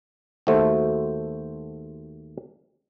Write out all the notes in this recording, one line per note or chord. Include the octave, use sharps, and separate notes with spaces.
D#2 A3 F#4 A4 C5